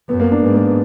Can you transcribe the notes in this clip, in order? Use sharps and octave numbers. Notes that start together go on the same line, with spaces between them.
F#2 B3
A#3
D4
G#2 B3
A#3
B3